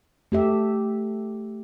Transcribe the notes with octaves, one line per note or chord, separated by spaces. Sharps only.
A3 G4 E5